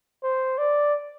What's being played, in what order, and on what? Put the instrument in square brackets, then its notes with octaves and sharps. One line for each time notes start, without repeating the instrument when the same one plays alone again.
[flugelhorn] C5
D5